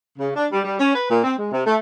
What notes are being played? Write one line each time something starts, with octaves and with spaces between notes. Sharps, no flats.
C#3
D4
G3
G3
C#4
B4
A#2
C4
G#3
C3
A3